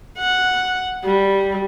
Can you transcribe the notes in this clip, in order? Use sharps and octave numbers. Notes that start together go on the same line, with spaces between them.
F#5
G3